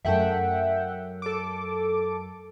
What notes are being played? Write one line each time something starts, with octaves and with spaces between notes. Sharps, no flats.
F#2 A3 E5 F#5 G5 A5
A4 D6